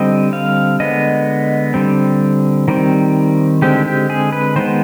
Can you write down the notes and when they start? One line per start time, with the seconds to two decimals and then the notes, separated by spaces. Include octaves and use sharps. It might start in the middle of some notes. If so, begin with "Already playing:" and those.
Already playing: D3 G3 C4 D#5
0.33 F5
0.80 D3 G#3 B3 D#5
1.74 D3 G3 C4
2.68 D#3 G3 C4
3.62 D3 G#3 C4 G4
3.85 G4
4.10 G#4
4.32 B4
4.56 D#3 G#3 B3 C5